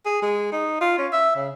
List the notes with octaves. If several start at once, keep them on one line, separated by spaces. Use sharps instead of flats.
G#4
G#3
D#4
F4
C#4
E5
C#3